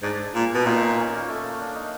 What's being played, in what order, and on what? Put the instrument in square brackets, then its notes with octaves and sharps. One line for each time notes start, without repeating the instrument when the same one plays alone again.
[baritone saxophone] G#2 [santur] D4
[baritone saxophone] A#2
B2
[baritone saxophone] A#2 [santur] D#4
[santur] D#4
C#4
A#3
A3
A#3
D4
D#4